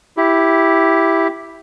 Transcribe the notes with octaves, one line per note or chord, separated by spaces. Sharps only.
E4 G4